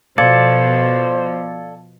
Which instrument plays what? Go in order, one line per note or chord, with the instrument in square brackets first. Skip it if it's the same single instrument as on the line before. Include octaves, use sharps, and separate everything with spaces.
[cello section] B2 F3 [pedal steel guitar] A4 D5 [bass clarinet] C5 [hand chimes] F5 G#6 C#7